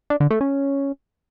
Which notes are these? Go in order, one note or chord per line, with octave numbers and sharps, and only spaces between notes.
D4
D3
A3
C#4